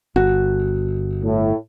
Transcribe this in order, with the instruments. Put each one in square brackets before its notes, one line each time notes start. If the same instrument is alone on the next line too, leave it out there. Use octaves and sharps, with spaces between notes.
[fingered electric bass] G1 [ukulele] F#4
[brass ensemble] A2